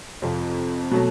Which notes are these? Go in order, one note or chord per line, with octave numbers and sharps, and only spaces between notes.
F2 C3 F3
B2 F#3 A3